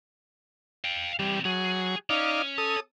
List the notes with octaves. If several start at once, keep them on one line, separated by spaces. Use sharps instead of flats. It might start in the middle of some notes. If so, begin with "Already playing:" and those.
F5 G5
E3 G3 C4
F#3 G#4
C#4 D#4 D5 F5
A4 D#6